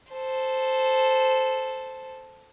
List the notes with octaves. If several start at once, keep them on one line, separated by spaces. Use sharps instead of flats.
A4 C5